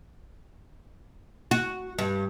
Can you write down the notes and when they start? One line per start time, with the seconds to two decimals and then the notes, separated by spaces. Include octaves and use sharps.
1.51 F#4
1.98 G2